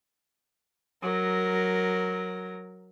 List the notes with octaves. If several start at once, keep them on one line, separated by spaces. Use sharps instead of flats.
F#3 A#4